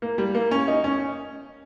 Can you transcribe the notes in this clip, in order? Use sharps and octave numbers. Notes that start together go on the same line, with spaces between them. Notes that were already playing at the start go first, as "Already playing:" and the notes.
A#3
G3
A#3
C#4
D#4
C#4